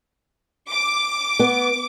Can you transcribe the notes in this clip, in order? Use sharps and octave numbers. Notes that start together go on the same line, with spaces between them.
D6
B3